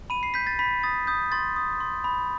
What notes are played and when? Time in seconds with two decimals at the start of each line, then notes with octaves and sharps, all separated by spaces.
0.10 B5 D#7
0.23 C7
0.34 G6 B6
0.47 A6
0.59 B5 B6
0.83 D#6 A6
1.07 D#6 G6
1.32 C6 A6
1.56 D#6
1.80 C6
2.04 B5